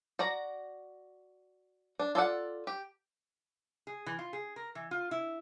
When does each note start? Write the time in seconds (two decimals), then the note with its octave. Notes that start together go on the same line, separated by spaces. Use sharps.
0.19 F#4 D5 A#5
1.99 D4
2.15 F4 A4 D5 F#5
2.67 G4
3.87 G#4
4.06 E3
4.19 F4
4.33 G#4
4.56 A#4
4.75 E3
4.91 F4
5.11 E4